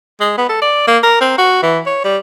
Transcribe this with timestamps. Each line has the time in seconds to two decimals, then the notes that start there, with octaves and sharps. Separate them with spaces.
0.20 G#3
0.38 B3
0.49 A4
0.62 D5
0.87 A#3
1.03 A#4
1.21 C4
1.38 F#4
1.63 E3
1.86 C#5
2.04 G3